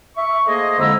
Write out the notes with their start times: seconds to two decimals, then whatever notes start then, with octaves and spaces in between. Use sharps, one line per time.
0.16 E5 C#6
0.47 A3 A#3 G#4 C5 D#5
0.78 F2 D3 G#3 E4 A#5 E6